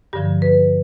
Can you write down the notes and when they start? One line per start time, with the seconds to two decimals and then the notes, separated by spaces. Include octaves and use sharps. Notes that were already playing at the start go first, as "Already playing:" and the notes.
0.13 G2 D3 F3 G4
0.42 B4